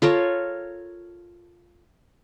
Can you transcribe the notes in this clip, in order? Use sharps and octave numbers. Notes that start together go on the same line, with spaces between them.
F4 A4 A#4 C#5